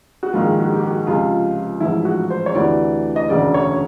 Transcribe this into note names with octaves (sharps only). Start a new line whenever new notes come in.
F#4
A#1 G#2 D#3 F4
F#4
G4
F#4
C#2 C3 F3 F4
A1 G#2 F3 E4
F#4
C5
C#5
D2 C3 E3 D5
D#5
E1 D2 C#3 D5
C#5